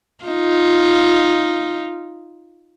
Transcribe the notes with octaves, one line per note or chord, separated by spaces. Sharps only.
D#4 F4